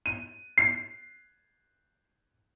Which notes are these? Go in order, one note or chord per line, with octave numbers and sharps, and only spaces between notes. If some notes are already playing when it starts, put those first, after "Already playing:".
D#7
C7